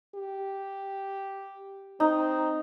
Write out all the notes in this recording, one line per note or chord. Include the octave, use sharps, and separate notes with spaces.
G4
C4 D#4